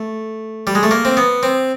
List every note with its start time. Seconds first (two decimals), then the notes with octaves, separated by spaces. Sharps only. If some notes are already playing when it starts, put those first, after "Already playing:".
Already playing: A3
0.67 G3
0.75 G#3
0.83 A3
0.91 A#3
1.05 C4
1.17 B3
1.43 C4